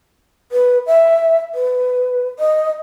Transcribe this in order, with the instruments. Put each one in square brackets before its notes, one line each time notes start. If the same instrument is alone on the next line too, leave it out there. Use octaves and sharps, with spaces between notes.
[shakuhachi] B4
E5
B4
D#5